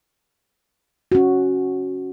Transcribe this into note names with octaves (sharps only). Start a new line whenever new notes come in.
C#4 F#4